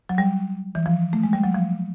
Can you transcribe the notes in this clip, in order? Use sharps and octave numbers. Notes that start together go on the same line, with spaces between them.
F#3
G3
E3
F3
A3
G#3
G3
F#3
F3